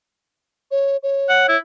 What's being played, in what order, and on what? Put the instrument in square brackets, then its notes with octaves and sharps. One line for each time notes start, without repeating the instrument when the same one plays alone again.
[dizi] C#5
C#5
[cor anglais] F#5
E4